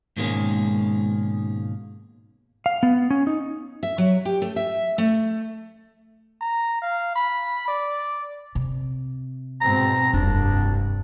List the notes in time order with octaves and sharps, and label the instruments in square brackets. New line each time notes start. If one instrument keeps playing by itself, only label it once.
[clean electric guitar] G#2 B2 D#3 G#3 A#3 C#4
[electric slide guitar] F5
B3
C#4
D#4
[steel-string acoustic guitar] E5
F#3
G4
A3
E5
A3
[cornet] A#5
F5
B5
D5
[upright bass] C3
[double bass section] G#2 B2 C4 [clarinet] A#5
[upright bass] F1 [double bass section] C2 G2 [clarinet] D4